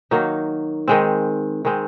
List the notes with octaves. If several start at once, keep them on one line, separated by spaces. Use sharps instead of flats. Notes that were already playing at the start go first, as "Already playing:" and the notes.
D#3 F#3 A#3 D#4
D#3 G#3 C4
D#3 G#3 C4